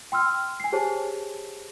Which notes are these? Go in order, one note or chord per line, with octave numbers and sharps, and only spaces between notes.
G5 C6 E6 F6
G#5 C7
G4 G#4 C5 C#5 A5